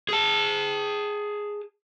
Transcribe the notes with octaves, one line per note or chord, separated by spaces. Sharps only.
G#4 A5